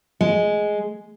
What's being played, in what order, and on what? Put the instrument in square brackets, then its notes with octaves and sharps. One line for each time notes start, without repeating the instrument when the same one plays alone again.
[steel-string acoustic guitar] G#3